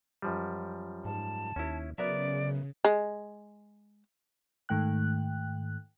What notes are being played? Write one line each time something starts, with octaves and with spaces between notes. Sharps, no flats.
F#2 F3 G3
G#2 A5
D#2 C#4 E4
C#3 F#3 B3 A#4 D5 E5
G#3
G#2 D#3 A3 G5 F#6